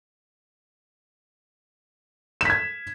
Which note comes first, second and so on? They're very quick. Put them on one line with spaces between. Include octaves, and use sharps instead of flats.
E7 B6 G#6